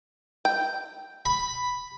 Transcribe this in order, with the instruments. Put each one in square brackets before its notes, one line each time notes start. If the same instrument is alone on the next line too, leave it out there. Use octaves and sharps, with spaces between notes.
[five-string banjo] G5
[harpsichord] B5